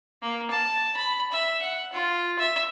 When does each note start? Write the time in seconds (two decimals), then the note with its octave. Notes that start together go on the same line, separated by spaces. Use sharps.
0.22 A#3
0.51 A5
0.97 B5
1.32 E5
1.62 F#5
1.93 F4
2.39 E5